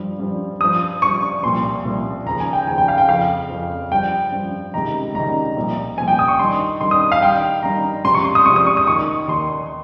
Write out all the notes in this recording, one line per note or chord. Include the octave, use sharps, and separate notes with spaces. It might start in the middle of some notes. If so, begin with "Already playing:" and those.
Already playing: G2 F3
G2 F3
G2 F3 D#6
G2 F3 C#6
C2 A#2 F3 C6
C2 A#2 F3
D#2 C#3 F3 A#5
G#5
G5
D#2 C#3 F3 G#5
G5
F5
G5
F2 C#3 F3 F5
F2 C#3 F3
G2 F3 G5
G2 F3
C#2 C3 D#3 A#5
C#2 C3 D#3 A#5
C2 A#2 F3
C2 A#2 F3 G#5
G5
D#6
C#6
G2 D#3 C6
G2 D#3 C6
D#6
F5
G2 D#3 G5
G2 D#3 A#5
C#2 C3 F3 C6
C#6
C6
D#6
C#2 C3 F3 C#6
D#6
C#6
D#6
D#2 D#3 C#6
D#2 D#3 C6